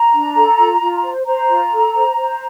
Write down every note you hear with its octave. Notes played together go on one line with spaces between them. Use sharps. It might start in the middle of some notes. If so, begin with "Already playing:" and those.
Already playing: A#5
D4
A4
F4
F4
C5
C5 A#5
F4
A4
C5
C5